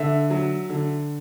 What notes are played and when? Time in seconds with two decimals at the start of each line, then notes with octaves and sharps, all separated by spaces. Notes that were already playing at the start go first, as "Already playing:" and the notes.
Already playing: D3 E5
0.30 F#3
0.70 D3